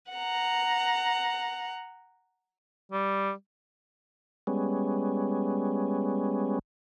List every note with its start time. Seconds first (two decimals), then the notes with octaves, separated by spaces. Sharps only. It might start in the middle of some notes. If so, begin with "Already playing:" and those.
0.13 F#5 A#5
2.92 G3
4.47 G3 G#3 B3 C#4